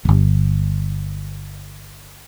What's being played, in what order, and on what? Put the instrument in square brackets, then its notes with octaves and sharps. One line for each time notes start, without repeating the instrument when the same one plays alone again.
[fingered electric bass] D1 G1